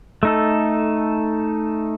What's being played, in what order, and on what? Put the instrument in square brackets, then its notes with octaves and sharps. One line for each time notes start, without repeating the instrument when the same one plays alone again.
[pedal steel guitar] A3 D#4 A4